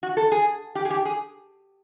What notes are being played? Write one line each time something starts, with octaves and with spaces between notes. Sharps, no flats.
F#4
A4
G#4
G4
G#4
G4
G#4